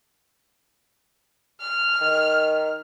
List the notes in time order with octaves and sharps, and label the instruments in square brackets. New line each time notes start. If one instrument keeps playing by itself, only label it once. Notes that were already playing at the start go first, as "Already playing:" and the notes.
[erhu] F6
[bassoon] D#3